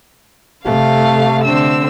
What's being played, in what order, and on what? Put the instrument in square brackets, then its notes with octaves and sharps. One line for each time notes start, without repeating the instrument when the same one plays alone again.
[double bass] C3 A3 [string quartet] F5
[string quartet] D3 C4 E6